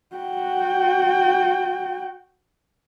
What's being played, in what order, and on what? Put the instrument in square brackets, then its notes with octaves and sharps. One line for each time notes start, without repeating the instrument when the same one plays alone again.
[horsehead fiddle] F#4 G5